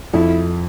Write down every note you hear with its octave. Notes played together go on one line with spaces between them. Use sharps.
F2 E4